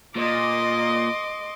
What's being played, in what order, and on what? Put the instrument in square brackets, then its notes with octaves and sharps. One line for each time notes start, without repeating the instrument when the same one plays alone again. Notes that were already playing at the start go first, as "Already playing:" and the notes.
[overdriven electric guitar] A#2 [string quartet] D#5 C6 D6